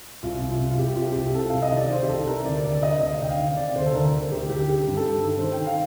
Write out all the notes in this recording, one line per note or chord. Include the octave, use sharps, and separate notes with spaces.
C2 F4
C2
F4
C2
F4
C2 G4
C3 F4
G4
C2
C3 A4
C2 F5
D#5
D#3 D5
D#3 C5
G4
C2 A4
C3 A#4
D2 D5
D2 D5
C3 D#5
D2 D#5
D2 G5
F5
D#3
C3 D5
D2 C5
A4
D2 A#4
D#3
D2 G4
D2 G4
D#3 G4
G2
A4
G2
D#3 A4
D#3 C5
G5
D#3 F5